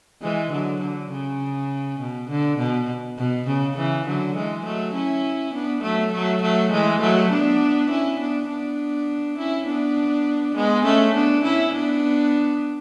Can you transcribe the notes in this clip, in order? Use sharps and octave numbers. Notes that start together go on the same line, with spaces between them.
E3 G#3
D3 F#3
D3
C#3
B2
D3
B2
B2
C#3
C#3 E3
D3 F#3
E3 G#3
F#3 A3
C#4 E4
B3 D4
F#3 A3
F#3 A3
F#3 A3
E3 G#3
F#3 A3
B3 D4
C#4 E4
B3 D4
B3 D4
C#4 E4
B3 D4
G#3 B3
A3 C#4
B3 D4
C#4 E4
B3 D4